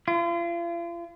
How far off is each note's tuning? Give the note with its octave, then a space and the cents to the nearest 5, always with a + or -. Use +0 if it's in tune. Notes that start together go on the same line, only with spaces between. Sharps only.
F4 -40